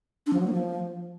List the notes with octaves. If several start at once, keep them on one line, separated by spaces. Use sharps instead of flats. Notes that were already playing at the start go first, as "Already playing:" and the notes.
D4
F3
F#3
A#3
F3